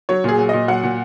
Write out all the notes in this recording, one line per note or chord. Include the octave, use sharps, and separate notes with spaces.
F#3 C#5
A#2 G#4
F#3
A#2 D#5
F#3 F#5
A#2